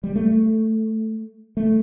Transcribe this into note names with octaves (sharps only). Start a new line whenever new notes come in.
G3
A3
A3